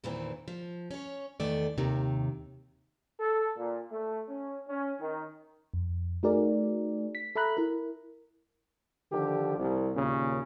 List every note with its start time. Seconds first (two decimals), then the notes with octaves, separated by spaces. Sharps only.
0.04 E2 A#2 D#3 E3 C4
0.48 F3
0.91 C#4 C#5
1.40 E2 D#3 A3 D5
1.78 D#2 C3 D#3
3.20 A4
3.57 A#2
3.92 A3
4.29 C#4
4.68 C#4
5.00 D#3
5.74 F2
6.23 A3 D#4 F#4 G#4 A#4 D5
7.15 B6
7.36 A4 E5 A#5 B5 F#6
7.57 E4 A#4
9.11 D3 D#3 F3 G4
9.58 C2
9.95 D#2 A#2 C#3 C#4